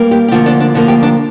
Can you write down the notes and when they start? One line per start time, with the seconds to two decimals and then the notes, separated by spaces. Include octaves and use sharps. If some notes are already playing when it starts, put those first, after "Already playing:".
Already playing: G2 G3 A#3
0.11 G4
0.28 G4
0.31 D2 D3 F3 A#3 F4
0.46 D4
0.60 D4
0.74 D2 D3 F3 A#3
0.88 G4
1.03 D4